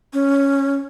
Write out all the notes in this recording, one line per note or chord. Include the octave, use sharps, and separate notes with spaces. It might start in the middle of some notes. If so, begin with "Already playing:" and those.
C#4